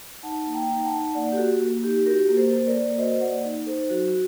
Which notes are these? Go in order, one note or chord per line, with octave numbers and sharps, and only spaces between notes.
D#4 F#5 A5
A#3
G5 A#5
D#4
F#5 A5
D#4
A#3 D5 F#5
G4
F#4 A4
A#3
D#4 G4
F#4 G4 A#4
A#3
A4 C5
A#3
A#4 D5
A#3
F#4 C5 D#5
A#3 D5 F#5
D#4
D#4 A4 C5
F#3 F#4
F#4